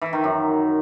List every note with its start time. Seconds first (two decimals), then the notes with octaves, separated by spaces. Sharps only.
0.02 E3
0.13 D#3
0.24 F#2